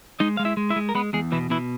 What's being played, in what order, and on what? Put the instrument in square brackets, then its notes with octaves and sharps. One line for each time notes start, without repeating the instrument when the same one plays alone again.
[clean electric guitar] G#3 D#4 D#5
G#3 F5
E4 E5
G#3
E4 E5
G#3
A#4
G#3 B3 B4
E2 G#3 G#4
B2 E3 E4
B2 E3 E4